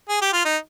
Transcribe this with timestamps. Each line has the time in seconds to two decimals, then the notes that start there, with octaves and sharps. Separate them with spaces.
0.09 G#4
0.22 G4
0.33 F4
0.45 D#4